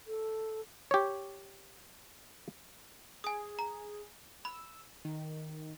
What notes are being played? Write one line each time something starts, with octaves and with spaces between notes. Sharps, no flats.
A4
G4 C#5
G#4 G#5 D#6
A#5
B5 E6
D#3